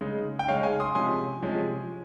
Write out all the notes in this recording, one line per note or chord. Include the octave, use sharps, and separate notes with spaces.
C#3 G#3 D#4
G5
C#3 G#3 D#4 C#5 F5
F5 G#5
C6 D#6
C3 F3 G#3 C#4 G#5 C6
C3 F3 G#3 C#4